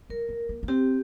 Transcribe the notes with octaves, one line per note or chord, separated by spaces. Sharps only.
G3 A#4
A#3
A#3
A#3
C4 G4